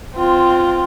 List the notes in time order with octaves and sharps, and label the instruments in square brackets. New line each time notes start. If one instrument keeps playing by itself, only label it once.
[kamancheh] C4 F4